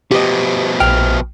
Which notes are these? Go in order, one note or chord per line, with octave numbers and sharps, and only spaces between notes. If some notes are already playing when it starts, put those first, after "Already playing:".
B2 F3 G4 D#5
A#1 G5 F6